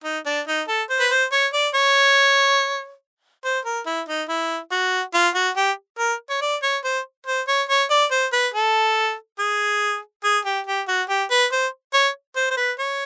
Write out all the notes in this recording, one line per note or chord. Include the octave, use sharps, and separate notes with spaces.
D#4
D4
D#4
A4
C5
B4
C5
C#5
D5
C#5
C5
A#4
E4
D#4
E4
F#4
F4
F#4
G4
A#4
C#5
D5
C#5
C5
C5
C#5
C#5
D5
C5
B4
A4
G#4
G#4
G4
G4
F#4
G4
B4
C5
C#5
C5
C5
B4
C#5